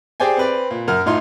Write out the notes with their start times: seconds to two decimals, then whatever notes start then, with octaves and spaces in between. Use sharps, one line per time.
0.20 G4 G#4 C5 D5 G5 G#5
0.37 C4 B4 D5
0.71 A#2
0.88 F#2 A#4 F#5 F6
1.06 A1 A2 D#4 F4 C6